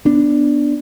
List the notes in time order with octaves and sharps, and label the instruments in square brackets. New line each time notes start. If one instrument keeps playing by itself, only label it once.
[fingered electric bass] B3 D4